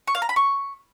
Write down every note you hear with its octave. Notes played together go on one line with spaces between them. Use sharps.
C#6
F5
A#5
B5
C#6